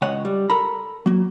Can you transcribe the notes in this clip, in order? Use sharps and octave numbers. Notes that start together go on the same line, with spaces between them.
C#2 C#5 D#5 F#5
G3
A4 A#4 A#5 B5
F#3 A#3